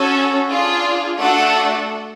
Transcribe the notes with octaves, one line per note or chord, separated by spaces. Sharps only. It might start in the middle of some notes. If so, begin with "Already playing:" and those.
Already playing: C#4 F#4 A4
D4 F4 G#4
A3 D4 F#4 A4 F#5